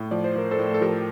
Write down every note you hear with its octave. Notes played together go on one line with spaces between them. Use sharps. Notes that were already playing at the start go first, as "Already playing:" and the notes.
Already playing: A2
F3 D5
C5
F3 A#4
A4 C5
A2
A4
F3 G4 A#4